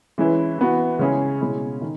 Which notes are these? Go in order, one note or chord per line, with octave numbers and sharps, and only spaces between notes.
E3 G#3 C#4 E4 B4
E3 B3 F#4
C#3 G#3 C#4 E4 G#4
B2 G#3 C#4 E4
D#3